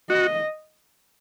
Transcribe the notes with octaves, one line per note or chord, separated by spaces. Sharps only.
F#4 D#5